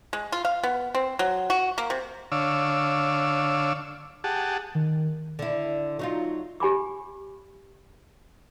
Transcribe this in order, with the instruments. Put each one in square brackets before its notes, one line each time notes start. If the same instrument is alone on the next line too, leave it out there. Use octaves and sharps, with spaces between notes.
[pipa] G#3
F4
F5
B3
C4
F#3
F#4
A#3
C3
[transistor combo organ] D3 C#5 F5 D6 E6
G4 G#4 F#5 A5
[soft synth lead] D#3
[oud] D3 E4
F#3 D#4 F4
[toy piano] G4 G#5 B5 D6